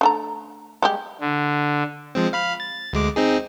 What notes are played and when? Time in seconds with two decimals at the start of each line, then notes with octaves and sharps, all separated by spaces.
0.01 D3 A3 A#5
0.82 G3 G#3 G4
1.21 D3
2.15 F3 G#3 C4
2.33 F5 B5 F6
2.60 A6
2.93 D2 G#3 D6
3.16 C4 D#4 G#4